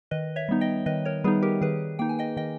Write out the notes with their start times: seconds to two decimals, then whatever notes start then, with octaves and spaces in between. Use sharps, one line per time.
0.11 D#3 B4 D#5
0.36 C#5 E5
0.49 G3 B3 D#4
0.61 D#5 G5
0.86 D#3 B4 D#5
1.05 A#4 C#5
1.24 G3 B3 D#4 G#4 B4
1.42 G4 A#4
1.61 D#3 G#4 B4
1.99 A#3 D#4 G5
2.09 G#5
2.19 D#5 G5
2.37 D#3 D#5 G5